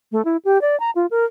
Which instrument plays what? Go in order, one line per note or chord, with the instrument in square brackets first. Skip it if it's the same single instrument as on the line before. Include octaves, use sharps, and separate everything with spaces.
[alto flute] A3
E4
G4
D5
A#5
F4
A#4